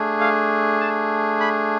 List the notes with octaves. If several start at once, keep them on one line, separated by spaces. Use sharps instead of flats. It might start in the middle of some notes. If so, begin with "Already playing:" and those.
Already playing: A3 D4 G#4
F5
A5
B5